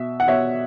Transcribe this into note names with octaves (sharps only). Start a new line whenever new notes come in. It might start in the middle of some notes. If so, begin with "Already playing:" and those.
Already playing: B2 E5
F#5
B2 C#5 E5